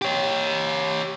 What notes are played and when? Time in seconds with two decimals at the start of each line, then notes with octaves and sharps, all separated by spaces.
0.02 G4 C#5